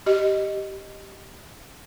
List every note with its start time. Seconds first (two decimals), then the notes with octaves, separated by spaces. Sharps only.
0.06 G4 D#5